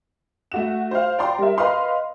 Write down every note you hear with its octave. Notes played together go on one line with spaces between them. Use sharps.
A3 F#4 E7
C5 F5
D5 G5 A#5 C6
G3 A#4 E5
B4 D#5 F5 C6